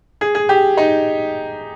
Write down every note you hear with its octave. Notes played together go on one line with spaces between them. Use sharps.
G#4
G#4
G4
D#4